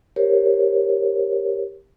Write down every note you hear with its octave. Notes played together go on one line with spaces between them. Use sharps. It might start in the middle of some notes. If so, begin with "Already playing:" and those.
G4 A#4 C5 C#5